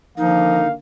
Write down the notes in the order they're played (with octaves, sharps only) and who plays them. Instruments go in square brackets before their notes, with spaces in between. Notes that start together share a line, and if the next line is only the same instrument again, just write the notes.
[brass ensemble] D3 D#3 A#3 [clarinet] F3 [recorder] D#4 [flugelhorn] F5